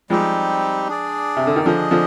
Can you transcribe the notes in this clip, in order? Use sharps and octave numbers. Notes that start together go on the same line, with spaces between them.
F3 G3 G#3 C4 D#4 G4
D4 G#4 D5
C3
D3
D#3
D3 F3 D4 G#4 D#5
D3 F3